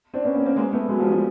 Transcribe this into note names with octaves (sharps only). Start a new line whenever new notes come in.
C4 D4
B3 C#4
A#3 C4
A#3 C4
G#3 A#3
A3 B3
F#3 G#3
F3 G3
F3 G3